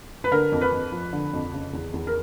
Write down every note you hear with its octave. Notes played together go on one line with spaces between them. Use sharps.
B4
D3 A#4
F2
B4
F2
F3
D3
F2
C#3
E2
E2
A#4